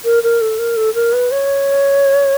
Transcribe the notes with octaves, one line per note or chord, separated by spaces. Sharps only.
A#4
A#4
A4
A#4
A4
A#4
B4
C#5